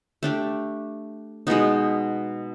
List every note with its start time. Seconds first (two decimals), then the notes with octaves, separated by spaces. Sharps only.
0.23 A3 D4 G4
1.47 B2 G#3 B3 D#4